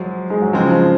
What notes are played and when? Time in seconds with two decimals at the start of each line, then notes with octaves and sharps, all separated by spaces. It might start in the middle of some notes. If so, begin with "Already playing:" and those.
Already playing: F3 F#3 G#3
0.30 G#3
0.42 F#3
0.53 C#3 F3 G#3 C4
0.72 F3